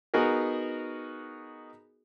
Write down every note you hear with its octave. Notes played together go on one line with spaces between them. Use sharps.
B3 D#4 F#4 G#4 A#4